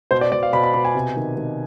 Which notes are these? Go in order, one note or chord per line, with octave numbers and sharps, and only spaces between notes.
B2 C5
D5
B2 D5
F5
B2 B5
B5
B2 B5
G#5
C3
D#3
D#3